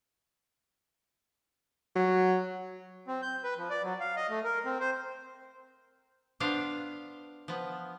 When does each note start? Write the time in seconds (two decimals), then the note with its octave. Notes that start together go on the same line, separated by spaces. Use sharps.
1.96 F#3
3.08 C4
3.22 G6
3.44 B4
3.57 F3
3.70 D5
3.84 F#3
4.00 F5
4.17 D#5
4.30 A3
4.44 A#4
4.65 C4
4.80 C5
6.40 B3 D4 F4 C5 F5
7.48 F3 B3